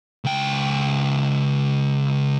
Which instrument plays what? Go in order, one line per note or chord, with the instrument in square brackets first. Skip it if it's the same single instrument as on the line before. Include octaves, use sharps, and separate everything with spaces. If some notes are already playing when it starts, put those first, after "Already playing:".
[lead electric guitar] C#2 G5